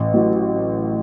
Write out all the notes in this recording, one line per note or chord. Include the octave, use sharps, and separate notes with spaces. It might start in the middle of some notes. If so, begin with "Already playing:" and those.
Already playing: A1
A2 F#3